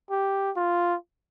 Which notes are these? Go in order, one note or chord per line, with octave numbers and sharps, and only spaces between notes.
G4
F4